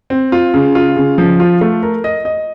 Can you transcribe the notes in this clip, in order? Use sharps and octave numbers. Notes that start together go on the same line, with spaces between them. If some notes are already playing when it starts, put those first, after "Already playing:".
C4
F4
C#3
F4
C#3
F3
F4
A3
A#4
D#5
D#5